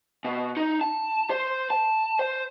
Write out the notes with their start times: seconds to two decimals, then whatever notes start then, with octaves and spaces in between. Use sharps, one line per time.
0.25 B2
0.57 D#4
0.81 A5
1.30 C5
1.70 A5
2.19 C5